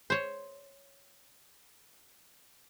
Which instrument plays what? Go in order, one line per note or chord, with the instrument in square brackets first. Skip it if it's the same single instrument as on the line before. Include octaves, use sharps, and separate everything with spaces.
[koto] C5 C#5